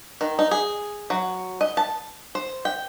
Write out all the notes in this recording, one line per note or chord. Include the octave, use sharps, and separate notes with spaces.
D#3
D#4
G#4
F#3
D#5
A5
C5
G5